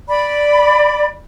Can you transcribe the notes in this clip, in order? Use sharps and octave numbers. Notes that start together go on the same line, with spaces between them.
D5 B5